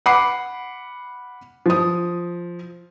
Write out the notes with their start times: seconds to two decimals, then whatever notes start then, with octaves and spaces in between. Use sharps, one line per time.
0.06 F#5 B5 D6 C7
1.66 F3 D#6